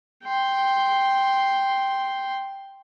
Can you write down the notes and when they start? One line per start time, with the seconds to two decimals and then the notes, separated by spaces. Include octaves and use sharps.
0.24 G5 C6